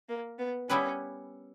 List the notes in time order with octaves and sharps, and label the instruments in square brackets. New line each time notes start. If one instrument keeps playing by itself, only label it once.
[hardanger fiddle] A#3
B3
[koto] G3 B3 E4 G4 B4 [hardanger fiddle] C#4